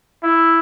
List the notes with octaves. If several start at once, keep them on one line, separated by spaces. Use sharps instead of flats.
E4